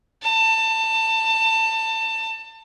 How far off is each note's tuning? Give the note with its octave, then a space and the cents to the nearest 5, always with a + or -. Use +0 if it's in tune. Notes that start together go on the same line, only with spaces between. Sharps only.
A5 +25